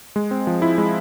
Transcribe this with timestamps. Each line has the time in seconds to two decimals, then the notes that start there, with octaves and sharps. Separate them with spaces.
0.16 G#3
0.31 C4
0.47 F3
0.62 E4
0.78 G#3